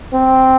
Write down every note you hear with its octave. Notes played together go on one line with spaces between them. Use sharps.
C4